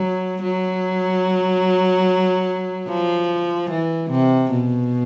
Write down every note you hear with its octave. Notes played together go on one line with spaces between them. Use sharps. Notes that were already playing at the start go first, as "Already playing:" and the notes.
Already playing: F#3
F#3
F3
E3
C3
B2